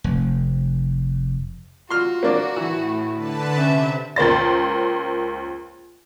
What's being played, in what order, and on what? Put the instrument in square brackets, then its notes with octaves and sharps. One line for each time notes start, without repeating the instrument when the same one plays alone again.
[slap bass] F1
[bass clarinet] F4 [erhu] F#4 [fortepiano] C6 F6
[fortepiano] A#3 D4
[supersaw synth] A2 [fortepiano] E3 [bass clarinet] E4
[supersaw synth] D3 B4 A5
[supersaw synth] C3 [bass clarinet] C#4 [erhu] E5
[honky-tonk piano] C#2 A#3 C5 A6